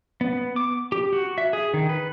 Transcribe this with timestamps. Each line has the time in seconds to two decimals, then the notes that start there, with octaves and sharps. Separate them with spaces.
0.21 B3
0.56 D6
0.92 G4
1.13 F#4
1.38 E5
1.53 G#4
1.74 D#3
1.89 B4